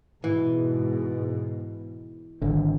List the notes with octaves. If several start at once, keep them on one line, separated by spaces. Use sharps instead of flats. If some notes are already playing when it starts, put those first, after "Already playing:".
G#2 B2 E3
G#1 D3